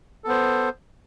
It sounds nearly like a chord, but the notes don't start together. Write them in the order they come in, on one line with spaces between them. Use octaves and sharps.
A4 B3 C5